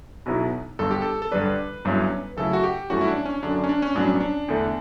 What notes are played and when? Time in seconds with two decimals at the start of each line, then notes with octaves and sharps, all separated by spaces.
0.26 B1 B2 F#3 B3 E4
0.79 G1 G2 D3 A4
0.91 G4
1.02 A4
1.22 A4
1.31 G2 D3 G3 D4 B4
1.85 G1 G2 F#3 C#4 E4
2.37 F#2 C#3 F#3 A3 E4 A4
2.53 F#4
2.63 G4
2.90 G2 E3 A3 C#4 F#4
3.01 E4
3.08 D4
3.25 C#4
3.43 F#2 D3 F#3 D4
3.56 D4
3.64 C#4
3.69 D4
3.82 C#4
3.95 A1 G2 F#3 B3 D4
4.08 C#4
4.20 D4
4.48 E2 D3 A3